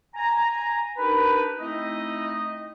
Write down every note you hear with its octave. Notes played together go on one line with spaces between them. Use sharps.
G#5 A#5
D4 D#4 G4 A#4 B4
A3 C4 D#4 E4 D#5